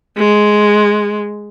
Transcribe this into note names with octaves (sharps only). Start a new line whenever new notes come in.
G#3